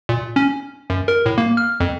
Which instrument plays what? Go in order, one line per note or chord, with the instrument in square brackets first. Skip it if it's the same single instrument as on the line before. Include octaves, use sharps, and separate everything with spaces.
[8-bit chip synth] A#2
C#4
F#2
A#4
A2
A#3
F6
F2